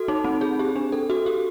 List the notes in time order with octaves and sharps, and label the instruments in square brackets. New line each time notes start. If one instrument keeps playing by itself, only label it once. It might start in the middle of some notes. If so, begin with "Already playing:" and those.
Already playing: [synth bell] F#4 A4
D#4
C4
G#4
G4
D4
A4
F#4
G4